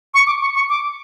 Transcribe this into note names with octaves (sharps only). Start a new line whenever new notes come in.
C#6
D6
C#6
C#6
D6